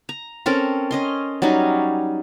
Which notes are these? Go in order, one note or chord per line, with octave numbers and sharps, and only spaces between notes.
A#5
C4 C#4 A4 A#4
C#4 D#5 C6
F#3 G3 C#4 D#4